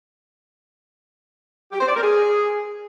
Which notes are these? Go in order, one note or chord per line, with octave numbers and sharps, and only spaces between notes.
G4
C5
D5
A#4
G#4